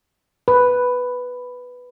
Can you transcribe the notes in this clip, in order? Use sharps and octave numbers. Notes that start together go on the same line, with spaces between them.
B4